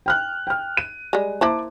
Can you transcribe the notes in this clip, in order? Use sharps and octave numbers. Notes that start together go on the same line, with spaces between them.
G5 F6 F#6
G5 F6
D#7
G3 G#3
A#3 E4 C5 A5 D6